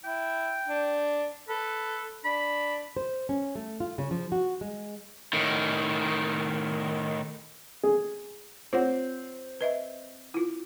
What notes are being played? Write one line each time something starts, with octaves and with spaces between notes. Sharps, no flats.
E4 G5
D4
A4 B4
D4 B5
C5
C#4
A3
F4
C#3
F3
F#4
G#3
A2 D#3
G#4
C4 F4 C#5 F#5
B4 D#5 E5
E4 F4